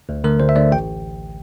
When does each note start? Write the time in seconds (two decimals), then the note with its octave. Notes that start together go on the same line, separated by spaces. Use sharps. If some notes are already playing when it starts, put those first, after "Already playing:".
0.09 D2
0.24 D3 A3 A#4
0.40 D2 C5
0.49 E5
0.56 D3 A3 D5
0.72 A1 G5